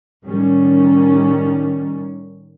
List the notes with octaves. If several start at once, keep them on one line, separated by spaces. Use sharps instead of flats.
A2 D#3 G3 C#4